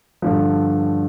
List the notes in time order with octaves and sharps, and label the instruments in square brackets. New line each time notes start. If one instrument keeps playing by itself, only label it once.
[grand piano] G2 D3 F3